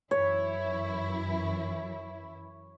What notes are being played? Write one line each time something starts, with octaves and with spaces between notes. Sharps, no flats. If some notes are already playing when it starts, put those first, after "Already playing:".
F#2 E3 E4 C#5